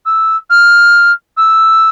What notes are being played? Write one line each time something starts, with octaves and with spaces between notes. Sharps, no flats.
E6
F6
E6